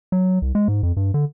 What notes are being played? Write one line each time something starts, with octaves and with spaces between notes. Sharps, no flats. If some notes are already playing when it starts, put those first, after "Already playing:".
F#3
C2
G#3
G#2
F2
G2
D3